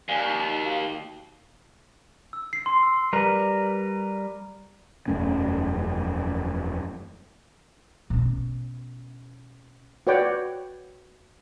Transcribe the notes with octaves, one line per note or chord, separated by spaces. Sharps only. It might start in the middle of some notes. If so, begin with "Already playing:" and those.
D#2 D5 F5 G#5
D#4 C#6
D#4 D#5
F#4 F5
E6
C7
C6
E6
G3 A#4 B4
E1 F#2 A3 C#4
B2 C#4
F#4 B4 C#5 D5 G5